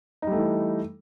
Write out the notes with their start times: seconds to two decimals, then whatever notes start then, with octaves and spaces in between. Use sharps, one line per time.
0.22 D#4
0.27 G3
0.32 A3
0.37 E3